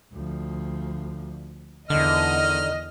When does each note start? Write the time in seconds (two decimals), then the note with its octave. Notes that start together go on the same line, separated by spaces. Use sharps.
0.12 D2 F3
1.90 E2 D3 D#3 D#5 F6